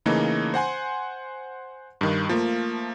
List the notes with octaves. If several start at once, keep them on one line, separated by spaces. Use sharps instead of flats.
C#3 E3 A3 A#3 D#4
C5 F#5 G#5 C6
G2 D#3
F3 A3 A#3